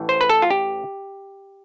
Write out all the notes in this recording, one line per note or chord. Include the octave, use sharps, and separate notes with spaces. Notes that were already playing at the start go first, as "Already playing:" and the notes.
Already playing: A1 A2 E3
C5
B4
A4
F4
G4